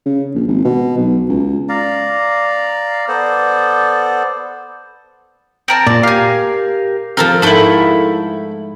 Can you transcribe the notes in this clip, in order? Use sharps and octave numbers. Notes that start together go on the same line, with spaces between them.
C#3
A#1
G#1
B2
B1
C#2
D5 F5 A#5
B3 A4 C5 D5
C4 A#4 A5
A#2 F4 D5
G4 A#4 F5 G#5 F6
F3 C4 A4 A#4
G#2 A3 E4 A4 G5